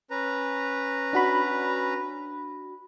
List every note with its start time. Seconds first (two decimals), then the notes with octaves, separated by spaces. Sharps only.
0.10 C#4 B4 A#5
1.13 D4 F#4 B5